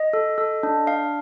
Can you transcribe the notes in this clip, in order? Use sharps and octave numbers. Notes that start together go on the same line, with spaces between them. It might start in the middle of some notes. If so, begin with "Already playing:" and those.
Already playing: D#5
A4
A4
D4
D4 F5